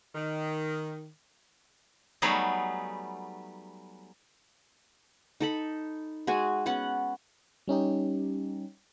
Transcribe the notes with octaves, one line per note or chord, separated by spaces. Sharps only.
D#3
F#3 G3 A3 B3 D#4 G#4
D#4 A4 B5
G#3 F#4 G#5
B3 C#4 F#5
G3 C#4 D#4 G4